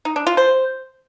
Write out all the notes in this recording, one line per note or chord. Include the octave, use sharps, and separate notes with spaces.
D#4
D4
F4
C5